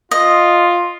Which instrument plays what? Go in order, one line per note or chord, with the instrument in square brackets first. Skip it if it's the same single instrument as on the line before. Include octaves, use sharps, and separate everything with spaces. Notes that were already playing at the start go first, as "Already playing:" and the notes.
[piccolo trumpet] F4 [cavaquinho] D#5